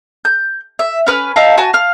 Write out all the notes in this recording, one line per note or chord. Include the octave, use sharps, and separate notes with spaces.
G6
E5
C#4 B4 F6
D#4 E5 F5 A5
F#4 G#5 A5
F5 F6